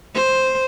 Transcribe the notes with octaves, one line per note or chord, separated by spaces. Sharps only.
C5